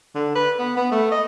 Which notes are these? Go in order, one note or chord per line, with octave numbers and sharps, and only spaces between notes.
D3
B4
B3
B3
A3
D#5